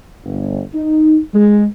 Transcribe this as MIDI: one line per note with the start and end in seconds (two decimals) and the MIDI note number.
0.25 0.60 31
0.74 1.18 63
1.33 1.65 56